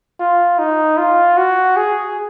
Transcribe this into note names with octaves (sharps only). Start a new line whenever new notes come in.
F4
D#4
F4
F#4
G#4